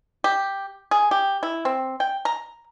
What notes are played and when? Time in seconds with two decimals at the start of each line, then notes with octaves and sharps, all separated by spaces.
0.24 G4
0.91 G#4
1.11 G4
1.43 E4
1.65 C4
2.00 G5
2.25 A#5